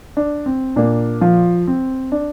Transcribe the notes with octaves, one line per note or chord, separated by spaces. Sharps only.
D4
C4
A#2 A#3 D4
F3 F4
C4
D4